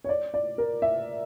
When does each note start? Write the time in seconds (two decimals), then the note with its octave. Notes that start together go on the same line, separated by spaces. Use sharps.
0.04 C#5
0.09 D5
0.34 D5
0.58 A#4
0.82 E5